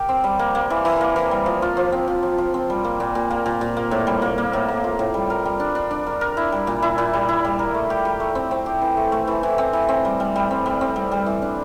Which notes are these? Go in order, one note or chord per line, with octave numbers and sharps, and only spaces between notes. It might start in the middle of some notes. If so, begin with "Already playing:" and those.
Already playing: G4 A#4
C4
G3
A#3
A#3
E3
E3
A#3
E3
G3
F3
F4
F3
C4
F3
F3
F4
C4
G3
A#3
A#2
A#2
A#3
A#2
A#2
A#3
A2
G3
A#3
A#3
A2
A#3
F4
A2
G3
A#4
G3
D4
D4
D4
A#4
A#4
E4
G3
A#2
E4
A#2
G3
E4
G3
A#4
A3
G4
G4
A3
C4
C4
G4
E3
A3
A3
E3
E3
C4
E3
C4
G3
G3
G3
C4
G3
C4
G3
G3
E3
D4